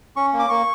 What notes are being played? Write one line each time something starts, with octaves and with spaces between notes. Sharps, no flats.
C#4 C#6
A#3
D6
A#3 C#6